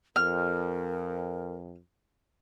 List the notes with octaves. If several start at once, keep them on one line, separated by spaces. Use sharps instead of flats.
F2 A#4 F6